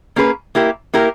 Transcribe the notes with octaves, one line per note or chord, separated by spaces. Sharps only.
A#3 C#4 G#4 B4
A#3 E4 G4 A#4
A#3 E4 G4 A#4